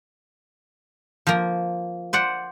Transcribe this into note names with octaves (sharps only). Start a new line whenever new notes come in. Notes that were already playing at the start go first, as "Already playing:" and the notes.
F3 A#3
C5 D5 F#5